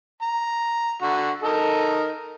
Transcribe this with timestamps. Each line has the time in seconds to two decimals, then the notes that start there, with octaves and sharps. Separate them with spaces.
0.22 A#5
1.02 D3 F#4
1.43 D#4 A4 A#4